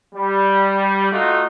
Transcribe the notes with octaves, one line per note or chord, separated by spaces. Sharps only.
G3
A3 D#4 F4 F#4